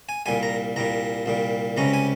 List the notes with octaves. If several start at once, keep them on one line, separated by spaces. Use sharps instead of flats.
G#5
C2 A#2 G3 G#5
A#5
C2 A#2 G3 A#5
C2 A#2 G3
C#2 C3 G3 C#4 A#5
G#5